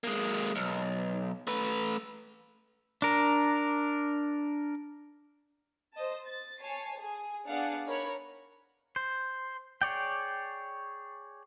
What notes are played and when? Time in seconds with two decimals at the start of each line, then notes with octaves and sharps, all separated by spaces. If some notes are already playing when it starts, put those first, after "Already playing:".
0.04 G#3 A#3
0.56 B1
1.47 A3 B4
3.02 D4 A#4
5.94 C5 D#5 A5
6.25 A6
6.59 C#5 G#5 A5 C7
6.97 G#4
7.46 B3 D4 G#4 D5 F5 F#5
7.85 D#4 A#4 C#5 B5
8.96 C5
9.82 G#4 C#5 D5 G5